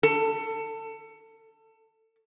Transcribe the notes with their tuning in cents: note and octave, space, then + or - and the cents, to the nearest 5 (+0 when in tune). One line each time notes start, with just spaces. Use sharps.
A4 +25